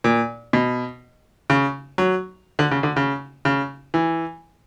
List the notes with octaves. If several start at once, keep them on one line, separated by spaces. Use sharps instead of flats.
A#2
B2
C#3
F#3
D3
C#3
D3
C#3
C#3
E3